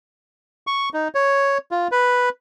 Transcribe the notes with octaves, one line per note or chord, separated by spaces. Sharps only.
C#6
D#4
C#5
F4
B4